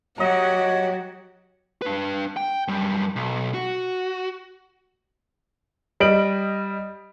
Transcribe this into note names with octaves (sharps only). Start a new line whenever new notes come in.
F#3 F#4 G4 C#5 D#5 F#5 A#5
D4 B4
G5
F#2 G3
B1
F#4
G3 D#5 D7 F#7